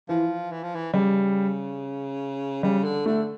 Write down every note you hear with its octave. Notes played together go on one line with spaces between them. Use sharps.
E3 F3
E3
F3
E3
C#3 G3
C#3 G3
D3
D3 A3